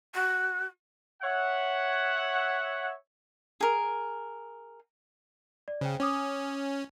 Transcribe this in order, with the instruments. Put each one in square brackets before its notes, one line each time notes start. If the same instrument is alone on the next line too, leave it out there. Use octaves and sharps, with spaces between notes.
[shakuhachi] F#4
[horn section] C#5 E5 F#5
[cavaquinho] G#4 A#4
[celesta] D5
[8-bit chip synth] C#3 [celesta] C5 G5
[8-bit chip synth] C#4 [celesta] G#5 D6 D#6